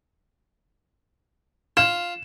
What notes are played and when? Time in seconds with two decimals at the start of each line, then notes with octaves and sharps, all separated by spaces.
1.77 F4 E7